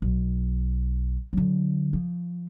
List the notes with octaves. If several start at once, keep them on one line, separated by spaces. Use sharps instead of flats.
B1
D3 F#3
F3